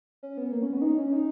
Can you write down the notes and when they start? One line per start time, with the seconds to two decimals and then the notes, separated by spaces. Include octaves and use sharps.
0.23 C#4
0.37 B3
0.52 A#3
0.62 C#4
0.73 B3
0.77 C#4
0.82 D#4
0.98 C#4
1.12 D#4